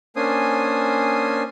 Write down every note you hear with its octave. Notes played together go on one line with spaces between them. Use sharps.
A#3 C#4 D4 C5 G#5 D#6